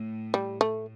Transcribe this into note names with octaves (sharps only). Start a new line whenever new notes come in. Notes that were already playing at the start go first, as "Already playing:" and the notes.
Already playing: A2
G3
A3